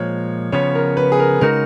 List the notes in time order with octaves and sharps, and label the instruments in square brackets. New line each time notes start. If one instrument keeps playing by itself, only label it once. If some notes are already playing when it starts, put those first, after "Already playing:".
Already playing: [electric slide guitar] A#2 F3 G#3 [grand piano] C#5
[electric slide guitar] C#3 F3 B3 [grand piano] C#5
[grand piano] A#4
B4
G#4
A#4
[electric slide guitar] C#3 G#3 D#4 F#4 [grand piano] A#4